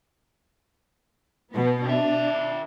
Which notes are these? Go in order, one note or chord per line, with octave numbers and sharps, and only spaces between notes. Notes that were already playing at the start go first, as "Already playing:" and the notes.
B2 B3
D#3 D4 E5